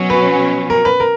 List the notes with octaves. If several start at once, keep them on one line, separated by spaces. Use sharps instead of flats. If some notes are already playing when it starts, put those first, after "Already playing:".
Already playing: B2 F#3 C#4
B4
A#4
B4
A#4